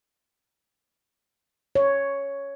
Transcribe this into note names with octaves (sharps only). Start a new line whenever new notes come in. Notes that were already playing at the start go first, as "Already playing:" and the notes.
C#5